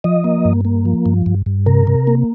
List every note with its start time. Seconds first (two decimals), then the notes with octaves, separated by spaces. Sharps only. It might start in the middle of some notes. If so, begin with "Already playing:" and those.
0.04 F3 D#5
0.24 A#3
0.45 G2
0.65 A#3
0.85 F3
1.06 G2
1.26 G2
1.46 G2
1.66 C3 A#4
1.87 C3
2.07 A#3